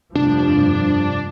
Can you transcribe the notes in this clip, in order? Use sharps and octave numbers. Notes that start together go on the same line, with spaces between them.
F1 G2 F3 D4